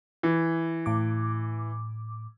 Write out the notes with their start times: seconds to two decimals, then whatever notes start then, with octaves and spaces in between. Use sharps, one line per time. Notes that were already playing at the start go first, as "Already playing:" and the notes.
0.23 E3
0.86 A2 D6